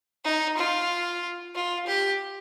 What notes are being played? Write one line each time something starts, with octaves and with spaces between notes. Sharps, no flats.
D#4
F4
F4
G4